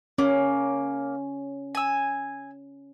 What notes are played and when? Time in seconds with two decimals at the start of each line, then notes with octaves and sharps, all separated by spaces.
0.18 A#3 C#4
1.75 G#5 E6